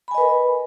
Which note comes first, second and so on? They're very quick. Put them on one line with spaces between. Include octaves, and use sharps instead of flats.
B5 G#5 D#5 B4 A#4